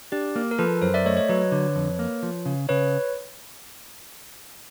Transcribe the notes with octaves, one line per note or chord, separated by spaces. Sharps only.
D4 G4
A#3
A#4
F3 A4 B4
F#2 A#4 C5
D5 E5
A3 C#5 D#5
C#5 D#5
F#3 B4 C#5
D3
F2
A#3
F3
C#3
C#3 B4 C#5